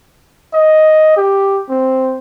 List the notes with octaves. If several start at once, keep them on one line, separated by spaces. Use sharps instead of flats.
D#5
G4
C4